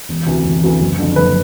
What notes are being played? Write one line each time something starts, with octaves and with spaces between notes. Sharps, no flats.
E1
D2 C3 E3
E1
D2 C3 E3
F#1
F2 D3
F#1 B4